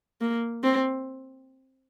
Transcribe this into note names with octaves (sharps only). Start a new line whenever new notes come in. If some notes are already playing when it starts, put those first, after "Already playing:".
A#3
C4